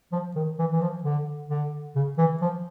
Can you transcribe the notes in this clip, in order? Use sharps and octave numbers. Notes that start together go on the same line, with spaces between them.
F3
D#3
E3
E3
F3
D3
D3
C#3
E3
F3